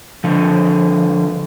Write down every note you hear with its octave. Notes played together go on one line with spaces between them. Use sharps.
D3 F3